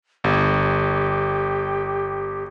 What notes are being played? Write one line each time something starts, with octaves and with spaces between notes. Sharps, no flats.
G1 G4